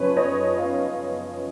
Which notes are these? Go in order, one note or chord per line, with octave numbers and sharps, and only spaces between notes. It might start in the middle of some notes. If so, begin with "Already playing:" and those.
Already playing: F#2 C#3 F3 B4 C#5
C#5 D#5
D#5 F5